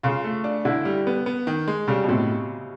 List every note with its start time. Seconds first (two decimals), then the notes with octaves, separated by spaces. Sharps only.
0.03 C#3 F4
0.24 A3
0.44 D4
0.65 D3 E4
0.85 G3
1.07 B3
1.26 B3
1.47 D#3
1.68 G#3
1.88 C#3 G3
2.04 B2
2.09 A2 C3